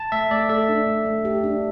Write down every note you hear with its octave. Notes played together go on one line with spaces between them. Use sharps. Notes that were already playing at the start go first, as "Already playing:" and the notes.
Already playing: A5
A3 E5
A3 D5
A4 E5
D4
A3
A3
G4
D4